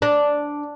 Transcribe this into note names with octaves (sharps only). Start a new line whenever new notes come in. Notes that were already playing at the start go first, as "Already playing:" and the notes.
D4